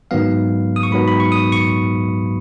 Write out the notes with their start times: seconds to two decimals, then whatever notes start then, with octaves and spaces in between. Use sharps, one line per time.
0.11 G#2 D#3 F#3 B3 F5
0.76 D#6
0.83 C#6
0.91 G#2 D#3 F#3 B3 B5
1.08 B5
1.20 C#6
1.32 D#6
1.52 C#6